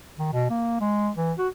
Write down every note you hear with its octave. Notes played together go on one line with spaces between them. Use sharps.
D#3
B2
A#3
G#3
E3
F#4